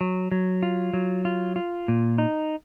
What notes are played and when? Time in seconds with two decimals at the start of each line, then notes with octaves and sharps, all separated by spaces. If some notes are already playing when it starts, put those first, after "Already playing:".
0.01 F#3
0.32 F#3
0.63 F4
0.94 F#3
1.25 F4
1.56 F4
1.88 A#2
2.18 D#4